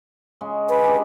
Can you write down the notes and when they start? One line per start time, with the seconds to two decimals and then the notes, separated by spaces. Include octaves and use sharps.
0.41 C#3 G#3
0.69 B4
0.84 G#3 D4 G4